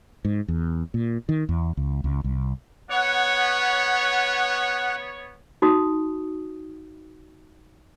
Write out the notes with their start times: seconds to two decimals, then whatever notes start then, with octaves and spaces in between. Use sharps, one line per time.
0.25 G#2
0.48 E2
0.94 A#2
1.29 D#3
1.49 E2
1.77 C#2
2.04 C#2
2.24 C2
2.90 B3 C#5 F#5
5.62 D#4 F#4 D#6